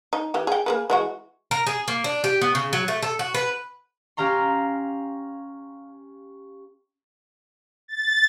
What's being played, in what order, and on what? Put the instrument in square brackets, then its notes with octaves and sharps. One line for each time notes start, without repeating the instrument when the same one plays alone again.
[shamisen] D#4
E3 G4
G#4 G5
A#3 G#4 B4
E3 G#3 F#4
[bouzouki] A#4
G#4
A#3
D4
G4
B3
C#3
F#3
A3
A4
F#4
B4
[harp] C#4 G4 F5 A#5 C6
[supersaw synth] A6